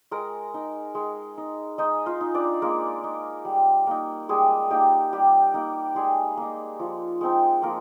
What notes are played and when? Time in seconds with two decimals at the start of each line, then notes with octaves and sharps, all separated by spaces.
0.11 G#3 A#4 A#5
0.54 D#4
0.95 G#3
1.38 D#4
1.78 G#3 D#4 D#5
2.06 F4 F5
2.21 D#4
2.34 D4 D5
2.62 G#3 A#3 A#4
3.04 D#4
3.45 G3
3.87 A#3 D#4
4.29 G3 G#3 G#4
4.70 A#3 D#4 G4
5.13 G3 G4
5.54 A#3 D#4
5.95 G3 G#3 G#4
6.37 A#3 D#4
6.79 F3
7.21 G#3 C4 D#4
7.62 F3 A#3 A#4